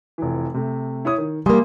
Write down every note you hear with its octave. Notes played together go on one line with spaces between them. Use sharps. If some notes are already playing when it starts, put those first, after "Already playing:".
F1 E3
C3 A3
E4 C#5 D#6
D#3
G3 A#3 G#5 C6 D#6